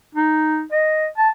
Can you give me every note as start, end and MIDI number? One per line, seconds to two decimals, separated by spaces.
0.15 0.63 63
0.72 1.06 75
1.18 1.29 81